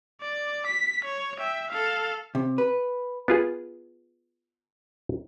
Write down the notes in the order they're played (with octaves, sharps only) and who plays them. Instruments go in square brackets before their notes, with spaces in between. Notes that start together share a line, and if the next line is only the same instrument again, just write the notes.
[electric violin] D5
B6
C#5
E5 G5
A4 F5
[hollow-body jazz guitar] C3
B4
[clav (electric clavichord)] B3 F4 G#4